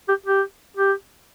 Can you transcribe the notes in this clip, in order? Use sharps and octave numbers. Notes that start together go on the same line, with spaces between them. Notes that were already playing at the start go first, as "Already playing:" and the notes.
G4
G4
G4